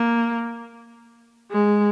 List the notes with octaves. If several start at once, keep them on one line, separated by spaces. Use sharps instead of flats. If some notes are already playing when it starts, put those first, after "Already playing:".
Already playing: A#3
G#3